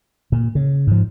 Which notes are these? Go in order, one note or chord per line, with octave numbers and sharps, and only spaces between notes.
A#2
C#3
G#2 F3